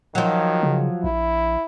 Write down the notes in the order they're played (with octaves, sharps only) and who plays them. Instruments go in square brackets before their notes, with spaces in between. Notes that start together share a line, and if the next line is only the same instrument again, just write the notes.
[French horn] D#3 [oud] F3 F#3
[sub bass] C#3
[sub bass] A#1 [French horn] E4